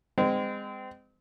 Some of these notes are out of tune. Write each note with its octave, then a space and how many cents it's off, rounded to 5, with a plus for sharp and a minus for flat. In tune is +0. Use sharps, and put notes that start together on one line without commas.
G#3 -25 C4 -25